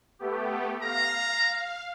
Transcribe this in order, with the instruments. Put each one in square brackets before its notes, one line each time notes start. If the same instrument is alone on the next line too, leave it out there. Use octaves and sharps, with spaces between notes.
[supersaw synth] A3 B3 G4
[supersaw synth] F5 [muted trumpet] A#5